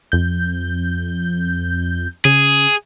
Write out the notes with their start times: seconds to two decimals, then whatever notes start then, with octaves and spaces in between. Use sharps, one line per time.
0.12 F2 G6
2.25 C#3 G#4